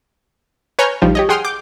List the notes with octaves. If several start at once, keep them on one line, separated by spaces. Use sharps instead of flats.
B4 C#5 G#5 A#5 F6 G6
A#1 D#3 F3 G3
G4 C#5 D#5
G#4 F#5 G5 C6 D#6 F6
D6 G6